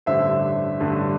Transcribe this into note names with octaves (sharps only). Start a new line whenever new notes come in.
A1 G2 D3 C5 E5
A1 G2 D3